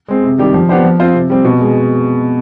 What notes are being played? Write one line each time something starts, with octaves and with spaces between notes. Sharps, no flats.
G#3 C4
C3
D#3 G3 D4 G4
F3
B3 D4 G4 C5
F3
C4 F4 C5
C3
G3 C4
B2
G#3